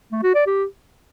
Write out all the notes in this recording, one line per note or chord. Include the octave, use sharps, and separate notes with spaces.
A3
F#4
D5
G4